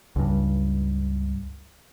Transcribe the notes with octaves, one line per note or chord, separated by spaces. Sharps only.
C#2 G2